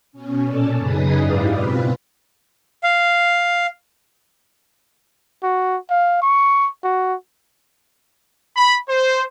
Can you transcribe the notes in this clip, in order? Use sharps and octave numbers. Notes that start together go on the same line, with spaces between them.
B2 C#4
A#2 C#4 A4 D5 A5
F#2 C#3 D#4 G#4 B4 D#6
G#2 E4 G4 D5 F5
B2 C4 F4 B4
F5
F#4
F5
C#6
F#4
B5
C5